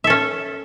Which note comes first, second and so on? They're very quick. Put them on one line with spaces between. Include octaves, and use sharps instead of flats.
E5 A4 C#4